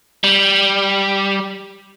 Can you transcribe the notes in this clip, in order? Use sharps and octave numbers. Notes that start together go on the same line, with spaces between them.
G3